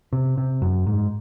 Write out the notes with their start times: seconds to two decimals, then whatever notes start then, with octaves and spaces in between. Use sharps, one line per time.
0.13 C3
0.38 C3
0.62 F#2
0.87 G#2